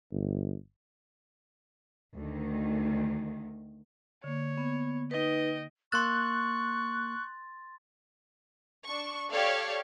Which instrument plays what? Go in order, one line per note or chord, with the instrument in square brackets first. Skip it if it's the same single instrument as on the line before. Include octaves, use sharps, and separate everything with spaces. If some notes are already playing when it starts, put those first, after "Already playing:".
[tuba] G1
[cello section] D2 D#3
[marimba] D3 A#3 [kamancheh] C#5
[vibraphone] B3
[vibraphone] D#4 B4 [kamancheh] D#5 G5
[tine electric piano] A#3 E6 [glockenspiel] C6 A6 [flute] C#6 [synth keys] F#6
[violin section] D4 C#6
G4 A4 C#5 D5 F5